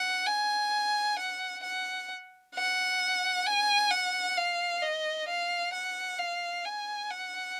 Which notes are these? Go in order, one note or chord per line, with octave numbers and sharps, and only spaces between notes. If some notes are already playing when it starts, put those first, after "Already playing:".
Already playing: F#5
G#5
F#5
F#5
F#5
G#5
F#5
F5
D#5
F5
F#5
F5
G#5
F#5